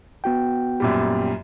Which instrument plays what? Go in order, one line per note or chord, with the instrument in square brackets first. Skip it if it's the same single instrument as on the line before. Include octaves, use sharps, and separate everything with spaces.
[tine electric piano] B3 F#4 G5
[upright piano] F#2 A#2 G3